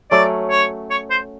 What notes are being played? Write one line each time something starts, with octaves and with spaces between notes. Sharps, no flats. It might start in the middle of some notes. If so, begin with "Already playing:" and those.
F#3 A3 C#4 D5
C#5
C#5
C5